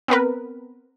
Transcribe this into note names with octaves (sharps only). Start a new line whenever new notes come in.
B3 C4 A#4 B4